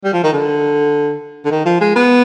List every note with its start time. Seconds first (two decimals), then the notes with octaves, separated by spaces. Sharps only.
0.04 G3
0.13 F3
0.24 D#3
0.33 D3
1.45 D3
1.51 D#3
1.66 F3
1.81 G#3
1.96 B3